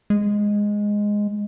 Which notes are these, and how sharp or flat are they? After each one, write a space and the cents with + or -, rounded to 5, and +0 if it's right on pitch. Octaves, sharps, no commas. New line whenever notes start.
G#3 -5